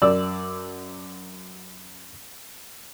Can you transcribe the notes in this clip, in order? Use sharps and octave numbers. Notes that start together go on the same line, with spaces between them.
F#2 D5 E6